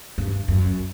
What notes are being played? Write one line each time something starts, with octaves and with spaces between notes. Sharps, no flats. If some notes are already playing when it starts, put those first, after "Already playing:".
G2
F#2